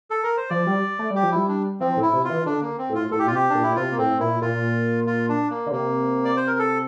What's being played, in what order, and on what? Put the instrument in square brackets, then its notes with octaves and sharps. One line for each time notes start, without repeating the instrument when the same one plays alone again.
[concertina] A4
A#4
C5
[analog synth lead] F3 [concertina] D5
[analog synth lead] G3
A3
[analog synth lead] G3 [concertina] G4
[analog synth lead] F3
[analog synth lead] G3 [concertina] E4
[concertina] D4
[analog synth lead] F3 [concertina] C4
[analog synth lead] A2
[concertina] E4
[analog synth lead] C3
[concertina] F4
[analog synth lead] E3
[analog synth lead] D3 [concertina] D4
[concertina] A#3
C4
[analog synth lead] A2
[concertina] F4
[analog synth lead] A2 [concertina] A4
[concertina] G4
[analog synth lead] A#2 [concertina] F4
[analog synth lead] C3 [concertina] G4
[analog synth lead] A#2 [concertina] D4
[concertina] E4
[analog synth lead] C3 [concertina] F4
[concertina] A#3
[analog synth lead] A2 [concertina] C4
[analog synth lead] A#2 [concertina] E4
[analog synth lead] A#2 [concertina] F4
[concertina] F4
D4
A#3
[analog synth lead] D3
[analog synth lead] C3 [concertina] A#3
[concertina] D5
C5
A#4
A4